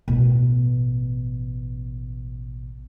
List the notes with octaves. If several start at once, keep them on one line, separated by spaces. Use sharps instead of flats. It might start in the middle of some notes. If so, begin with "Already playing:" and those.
A1 B2